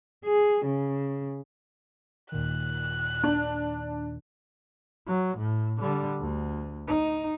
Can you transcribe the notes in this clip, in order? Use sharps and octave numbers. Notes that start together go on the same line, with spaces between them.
G#4
C#3
D#2 A#2 D#3 F#6
D4
F#3
A2
D3 G3
D2
D#4